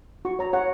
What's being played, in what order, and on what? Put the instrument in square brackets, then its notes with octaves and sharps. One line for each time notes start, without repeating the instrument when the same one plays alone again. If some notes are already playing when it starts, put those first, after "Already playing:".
[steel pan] F#4 C#6
C#5 A#5
C#5 F#5